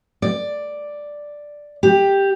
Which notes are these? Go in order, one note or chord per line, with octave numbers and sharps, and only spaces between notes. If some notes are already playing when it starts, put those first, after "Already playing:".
D5
G4